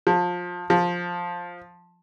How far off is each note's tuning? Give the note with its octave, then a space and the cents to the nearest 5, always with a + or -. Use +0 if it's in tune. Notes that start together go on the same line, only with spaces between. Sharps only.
F3 +25
F3 +10